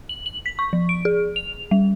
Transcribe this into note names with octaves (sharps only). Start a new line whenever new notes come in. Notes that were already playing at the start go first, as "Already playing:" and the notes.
F#7
F#7
B6
C#6
F3
D7
G#4
F7
G3